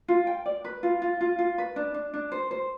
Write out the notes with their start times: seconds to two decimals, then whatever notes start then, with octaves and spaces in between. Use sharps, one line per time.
0.08 F4
0.27 G5
0.46 D5
0.64 B4
0.83 F4
1.02 F4
1.21 F4
1.38 F4
1.58 B4
1.76 D4
1.94 D4
2.14 D4
2.32 C5
2.51 C5